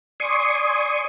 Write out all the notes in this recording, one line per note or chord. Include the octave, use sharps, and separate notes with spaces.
D5 G#5 C6 C#6 D#6